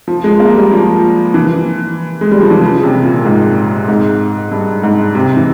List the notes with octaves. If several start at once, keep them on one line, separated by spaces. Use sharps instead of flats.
F3
G#3
A#3
G3
F3
E3
G#3
G3
F3
E3
C#3
C3
A#2
G#2
G#2
G2
G#2
C3
E3